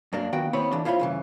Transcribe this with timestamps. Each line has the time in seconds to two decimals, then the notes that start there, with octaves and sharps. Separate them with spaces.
0.13 F#2 A#3 D4
0.33 A#2 D#3 B3 F#4 G5
0.53 D#2 B3 C4 E4 C#5 B5
0.73 D3 E3 D4
0.85 E4 F4 C5 C#5 B5
0.99 G2 C#3 E3